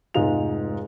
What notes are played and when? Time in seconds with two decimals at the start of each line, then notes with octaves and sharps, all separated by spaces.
0.14 F1 G#2 G#3 F4 F7